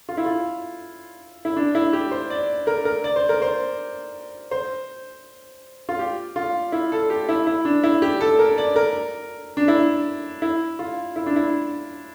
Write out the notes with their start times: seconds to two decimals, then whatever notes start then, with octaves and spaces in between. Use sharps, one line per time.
0.09 F4
0.17 E4
0.26 F4
1.45 E4
1.56 D4
1.75 E4
1.93 G4
2.11 C5
2.30 D5
2.67 A#4
2.85 A#4
3.04 D5
3.16 C5
3.29 A#4
3.42 C5
4.51 C5
5.89 F4
5.99 G4
6.36 F4
6.72 E4
6.92 A4
7.10 G4
7.29 E4
7.47 E4
7.65 D4
7.84 E4
8.02 G4
8.21 A4
8.39 A#4
8.58 D5
8.76 A#4
9.57 D4
9.68 E4
10.42 E4
10.79 F4
11.16 E4
11.26 D4
11.36 E4